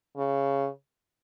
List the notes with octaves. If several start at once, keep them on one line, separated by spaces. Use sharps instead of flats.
C#3